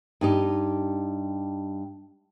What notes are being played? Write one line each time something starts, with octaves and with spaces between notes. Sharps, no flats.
G2 D#4 G4